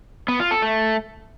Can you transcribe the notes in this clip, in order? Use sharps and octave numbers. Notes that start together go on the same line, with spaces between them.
B3
F4
A4
A3